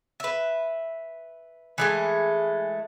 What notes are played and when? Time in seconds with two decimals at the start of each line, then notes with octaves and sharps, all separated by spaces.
0.20 B4 E5
1.78 E3 G#3 A3